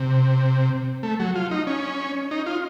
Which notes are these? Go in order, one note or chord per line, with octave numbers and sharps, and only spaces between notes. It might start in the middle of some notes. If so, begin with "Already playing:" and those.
Already playing: C3
A3
F#3
F4
D#4
C#4
D#4
F4